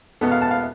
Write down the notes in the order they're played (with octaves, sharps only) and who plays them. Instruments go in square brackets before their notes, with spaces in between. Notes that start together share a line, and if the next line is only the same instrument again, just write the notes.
[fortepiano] E2 B2 B3 A4
F5
A5
F5